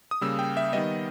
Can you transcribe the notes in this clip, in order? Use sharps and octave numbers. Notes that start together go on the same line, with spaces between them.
D#6
C#3 G3 A#3 E6
G5
E5
D#3 G3 B3 D#5